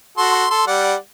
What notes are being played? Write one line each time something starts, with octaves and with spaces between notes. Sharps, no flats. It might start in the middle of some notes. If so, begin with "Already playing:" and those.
F#4 A4 C6
A4 C6
G3 D5 F#5